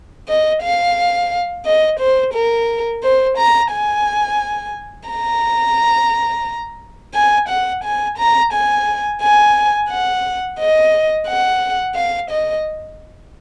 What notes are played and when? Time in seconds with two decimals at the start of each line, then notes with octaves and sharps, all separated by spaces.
0.28 D#5
0.63 F5
1.65 D#5
1.99 C5
2.33 A#4
3.03 C5
3.38 A#5
3.71 G#5
5.09 A#5
7.14 G#5
7.49 F#5
7.83 G#5
8.18 A#5
8.53 G#5
9.21 G#5
9.90 F#5
10.59 D#5
11.27 F#5
11.95 F5
12.30 D#5